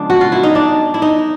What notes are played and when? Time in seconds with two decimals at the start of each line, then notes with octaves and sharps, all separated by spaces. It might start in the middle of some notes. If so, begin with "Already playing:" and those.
Already playing: C#3 F3 G#3 B3 D4
0.10 F#4
0.21 F4
0.32 E4
0.43 D#4
0.55 D4
0.94 E4
1.02 D#4